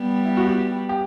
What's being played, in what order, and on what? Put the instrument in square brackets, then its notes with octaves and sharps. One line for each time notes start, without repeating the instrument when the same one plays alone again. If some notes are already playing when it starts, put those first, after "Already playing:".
Already playing: [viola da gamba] G3 B3
[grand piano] E4
F#4
G4
G4